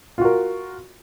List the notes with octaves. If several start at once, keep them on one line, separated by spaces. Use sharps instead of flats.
F4 F#4 A#4